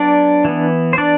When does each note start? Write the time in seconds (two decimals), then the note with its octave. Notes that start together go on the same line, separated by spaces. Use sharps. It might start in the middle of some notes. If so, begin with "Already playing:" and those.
Already playing: F#3 B3 D4 D5
0.45 E3 B3
0.93 C5
0.98 D4 D5